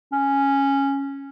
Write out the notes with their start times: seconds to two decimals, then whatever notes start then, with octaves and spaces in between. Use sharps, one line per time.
0.13 C#4